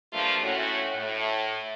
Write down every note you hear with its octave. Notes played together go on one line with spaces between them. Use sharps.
G2 F3 A3 A#3 D4 F4
A2 C#4 F#4
A2